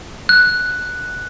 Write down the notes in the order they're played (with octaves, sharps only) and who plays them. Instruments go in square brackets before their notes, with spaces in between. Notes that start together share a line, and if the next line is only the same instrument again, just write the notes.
[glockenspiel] F#6